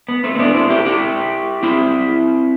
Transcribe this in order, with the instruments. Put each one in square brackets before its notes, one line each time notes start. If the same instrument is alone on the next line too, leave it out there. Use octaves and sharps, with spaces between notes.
[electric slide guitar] B3
A3 C4
C4
B3 D4
C4 E4
E4 G4
E4 G4
C4 E4